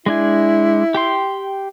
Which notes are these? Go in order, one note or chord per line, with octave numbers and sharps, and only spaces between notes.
G#3 D4 E4 G#5
G4 G5 C6